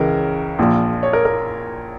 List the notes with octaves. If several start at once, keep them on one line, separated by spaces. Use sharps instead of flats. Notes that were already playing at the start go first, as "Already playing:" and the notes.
Already playing: C#2 C#3 E3 A#4
A#1 A#2 F3
C#5
A#4
A#4